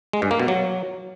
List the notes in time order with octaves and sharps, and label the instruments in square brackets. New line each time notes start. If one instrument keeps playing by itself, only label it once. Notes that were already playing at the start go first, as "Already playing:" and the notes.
[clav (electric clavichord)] G#3
G2
A#3
B2
F#3